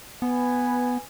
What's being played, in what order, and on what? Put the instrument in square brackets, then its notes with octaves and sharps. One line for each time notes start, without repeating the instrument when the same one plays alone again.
[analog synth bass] B3 [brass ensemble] B4 G#5